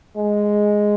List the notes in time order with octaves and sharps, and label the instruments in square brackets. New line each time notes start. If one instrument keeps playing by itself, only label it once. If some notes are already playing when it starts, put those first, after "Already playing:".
[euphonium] G#3